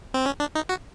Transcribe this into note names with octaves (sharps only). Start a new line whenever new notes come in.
C4
C#4
D4
D#4
F#4